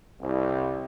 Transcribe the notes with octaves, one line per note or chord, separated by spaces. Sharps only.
C2